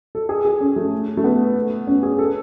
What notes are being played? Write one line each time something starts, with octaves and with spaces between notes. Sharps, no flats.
A4
G#4
G#4
C#4
A3
A3
B3
C#4
G#4
A4